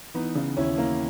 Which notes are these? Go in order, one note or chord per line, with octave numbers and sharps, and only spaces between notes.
E3 B3 D#4
C#3
D#2 C#4 E4
E3 A#3